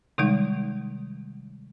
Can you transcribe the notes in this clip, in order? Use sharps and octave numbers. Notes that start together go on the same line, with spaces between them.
C3 D#3 G3 G#3 D#4